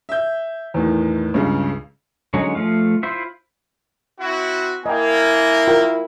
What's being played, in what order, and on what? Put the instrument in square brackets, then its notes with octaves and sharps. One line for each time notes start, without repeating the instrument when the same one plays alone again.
[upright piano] E5 G6
E2 A2 D#3
C#2 G2 C#3
[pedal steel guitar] D3 F#3 G#3 C#4 D#4
F3 A3 F5
E4 F4 C5 E5
[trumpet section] C4 E4 F#4
[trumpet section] A#3 [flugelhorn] E4 [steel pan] D#5 G5 [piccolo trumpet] G#5
[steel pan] F4 A#4 G5